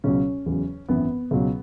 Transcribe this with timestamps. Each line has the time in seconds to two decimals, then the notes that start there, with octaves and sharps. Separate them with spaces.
0.04 C#2 B2 F#3 C#4
0.46 E2 C#3 F#3
0.88 G#1 F#2 E3 B3
1.31 C#2 B2 F#3